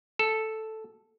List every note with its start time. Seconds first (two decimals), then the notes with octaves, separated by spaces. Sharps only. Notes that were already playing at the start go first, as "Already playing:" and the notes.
0.19 A4